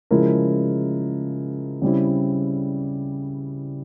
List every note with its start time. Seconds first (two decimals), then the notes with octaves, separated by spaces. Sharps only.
0.11 C#3 F3 G#3 E4 A#4
1.82 C#3 G3 C4 E4